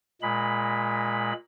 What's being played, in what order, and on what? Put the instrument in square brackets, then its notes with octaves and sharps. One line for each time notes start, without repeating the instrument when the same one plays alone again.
[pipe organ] A#2 G#3 B5